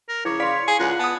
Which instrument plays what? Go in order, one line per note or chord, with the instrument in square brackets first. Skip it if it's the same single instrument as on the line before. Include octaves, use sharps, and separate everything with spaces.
[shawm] A#4
[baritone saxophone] C#3 [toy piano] E4 D6 [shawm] C#5
[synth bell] D5 F5 B6 [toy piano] B5 C6
[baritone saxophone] G#4
[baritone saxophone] C#2 [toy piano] F4 [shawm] F#5
[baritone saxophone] B3 [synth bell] A5 D#6